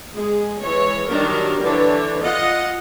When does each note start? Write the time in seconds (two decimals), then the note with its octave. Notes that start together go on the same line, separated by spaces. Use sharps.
0.14 G#3 G#4
0.62 E3 G#3 C#5
1.09 D#3 F#3 G3 D4 A#4
1.62 D3 E3 D4 C#5
2.21 F4 D#5 F#5